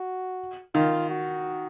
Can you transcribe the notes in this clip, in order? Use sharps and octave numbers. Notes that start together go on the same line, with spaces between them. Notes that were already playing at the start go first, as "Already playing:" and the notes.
Already playing: F#4
D#3 F4
F#4